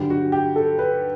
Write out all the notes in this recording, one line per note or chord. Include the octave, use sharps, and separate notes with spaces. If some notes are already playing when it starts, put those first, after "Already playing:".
Already playing: G2 D3 F#3 G4
F#4
G4
A4
B4